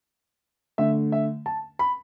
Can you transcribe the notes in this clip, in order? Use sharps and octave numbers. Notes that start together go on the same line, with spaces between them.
D3 A3 E5
E5
A5
B5